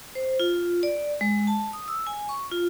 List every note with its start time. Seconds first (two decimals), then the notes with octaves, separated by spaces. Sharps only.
0.15 C5
0.40 F4
0.83 D5
1.21 G#3
1.47 A5
1.73 D#6
1.88 E6
2.07 G#5
2.29 C#6
2.52 F4